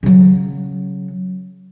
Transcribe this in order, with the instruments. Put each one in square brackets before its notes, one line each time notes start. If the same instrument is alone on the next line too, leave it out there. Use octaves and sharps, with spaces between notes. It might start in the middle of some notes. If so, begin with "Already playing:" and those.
[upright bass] C#3 F#3